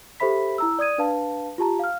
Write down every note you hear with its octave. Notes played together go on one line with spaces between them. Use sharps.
G4 A4 C5 E5 B5 B6
E4 A#5 E6
D5 D#6 G#6 D#7
D4 B4 F5 A5
F4 G4 A5 A#5
F5 F6